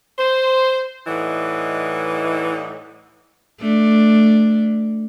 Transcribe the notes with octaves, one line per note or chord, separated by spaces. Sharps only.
C5
A2 E3 G3 D#4 D#5 F#5
A3 D4